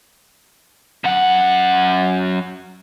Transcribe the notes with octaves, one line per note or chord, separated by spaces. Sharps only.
F#2 F#5